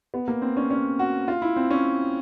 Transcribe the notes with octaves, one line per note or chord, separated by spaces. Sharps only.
B3
A#3
C4
C#4
C#4
F#4
F4
E4
C4
C#4